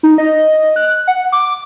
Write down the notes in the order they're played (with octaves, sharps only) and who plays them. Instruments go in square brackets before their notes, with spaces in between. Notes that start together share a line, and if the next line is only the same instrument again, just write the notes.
[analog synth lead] D#4
D#5
F#6
F#5
D6